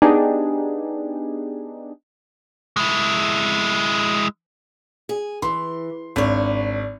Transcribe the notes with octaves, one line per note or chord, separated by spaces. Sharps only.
B3 D4 D#4 G4 G#4
G#3 E4
G#4
E3 C6
G#1 D4 C#5